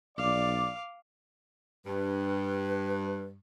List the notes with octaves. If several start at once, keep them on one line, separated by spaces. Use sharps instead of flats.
B1 D5 F5 D6
G2 B4